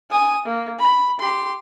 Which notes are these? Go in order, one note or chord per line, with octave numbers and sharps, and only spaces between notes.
G#5 D#6
A#3
B5
G4 C6